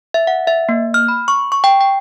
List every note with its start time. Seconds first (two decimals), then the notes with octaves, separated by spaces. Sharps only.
0.14 E5
0.27 F#5
0.47 E5
0.69 A#3
0.94 F6
1.08 B5
1.28 C#6
1.52 C#6
1.64 G5
1.81 G5